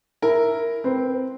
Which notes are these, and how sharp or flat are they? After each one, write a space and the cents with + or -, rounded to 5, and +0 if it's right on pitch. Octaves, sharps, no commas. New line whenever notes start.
E4 +0 A#4 +0
C4 -5 B4 +0